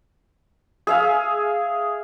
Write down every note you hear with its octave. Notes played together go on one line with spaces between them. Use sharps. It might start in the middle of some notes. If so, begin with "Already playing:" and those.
G#4 E5 F5